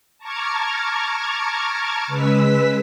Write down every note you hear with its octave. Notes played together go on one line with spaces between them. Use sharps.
A5 A#5 C#6 D6 F6 G#6
C#3 G#3 B4 E6 B6